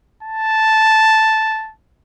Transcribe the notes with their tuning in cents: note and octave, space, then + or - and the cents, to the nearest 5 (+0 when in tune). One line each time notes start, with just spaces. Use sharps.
A5 -5